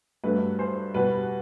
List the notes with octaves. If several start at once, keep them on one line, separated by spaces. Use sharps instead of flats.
G2 F#3 A3 B4
C5
B2 G3 B4